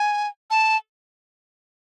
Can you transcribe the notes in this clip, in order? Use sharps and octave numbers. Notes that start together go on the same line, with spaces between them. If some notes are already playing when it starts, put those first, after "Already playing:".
Already playing: G#5
A5